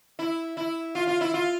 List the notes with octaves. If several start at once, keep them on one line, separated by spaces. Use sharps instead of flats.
E4
E4
F4
F4
E4
F4